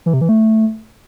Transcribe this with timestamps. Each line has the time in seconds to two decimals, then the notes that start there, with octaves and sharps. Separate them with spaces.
0.06 E3
0.14 C3
0.21 E3
0.29 A3